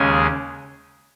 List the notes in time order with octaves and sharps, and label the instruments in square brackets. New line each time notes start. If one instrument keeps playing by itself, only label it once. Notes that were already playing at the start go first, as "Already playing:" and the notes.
Already playing: [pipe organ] D#2 C#3 G#3 C#4 G#5